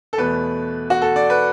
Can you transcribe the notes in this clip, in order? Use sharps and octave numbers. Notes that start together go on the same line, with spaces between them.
A4
E2 B2 A3 B4
F#4
A4
D5
B4